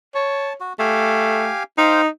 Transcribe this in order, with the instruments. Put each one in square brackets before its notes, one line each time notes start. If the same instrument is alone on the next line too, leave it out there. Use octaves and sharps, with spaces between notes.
[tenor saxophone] C#5 [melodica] A5
[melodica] F#4
[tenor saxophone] A3 [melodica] G4 F5 G#5
[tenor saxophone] D#4 [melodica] C5 F5 G5